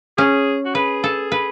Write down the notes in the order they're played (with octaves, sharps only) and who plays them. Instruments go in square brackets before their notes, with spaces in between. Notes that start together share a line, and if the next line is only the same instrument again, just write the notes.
[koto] C#4 [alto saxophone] G#4
[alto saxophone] F#4
[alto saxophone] G#4 [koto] B4
[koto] A4
B4